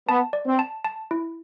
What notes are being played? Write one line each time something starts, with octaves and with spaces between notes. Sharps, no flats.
B3 A5
D5
C4
A5
A5
E4